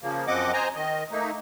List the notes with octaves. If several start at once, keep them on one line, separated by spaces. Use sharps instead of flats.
C#3 F3 A#3
F#2 F3 C4 D#5 F#5 D6
C5 D#5 G#5 A#5
D#3 D#5
A3 A#3 D#4